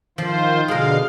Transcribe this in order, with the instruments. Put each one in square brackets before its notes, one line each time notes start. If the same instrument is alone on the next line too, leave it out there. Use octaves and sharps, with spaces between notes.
[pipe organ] D#3 F4 C5 [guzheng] F3
[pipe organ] B2 D3 F5 [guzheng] G#3 A#4